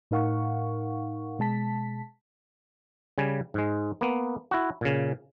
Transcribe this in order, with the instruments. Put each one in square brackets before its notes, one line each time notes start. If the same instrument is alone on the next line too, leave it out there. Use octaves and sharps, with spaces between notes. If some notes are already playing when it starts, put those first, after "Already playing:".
[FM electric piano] A2 D#4 A#4 F5 F#5 C#6
B2 G#3 A5 B6
[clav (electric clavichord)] C#3 G3 G#5
G#2 G#3
A#3 B3
E4 F#4
A#2 C#3